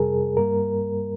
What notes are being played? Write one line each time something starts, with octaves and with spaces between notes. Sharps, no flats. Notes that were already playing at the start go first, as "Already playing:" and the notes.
Already playing: F2 C3 G3 G#4 A#4
G2 G3 A#3 A#4